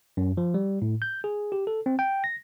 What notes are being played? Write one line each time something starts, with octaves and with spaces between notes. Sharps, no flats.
F#2
F3
G3
A2
G6
G#4
G4
A4
C4
G5
A#6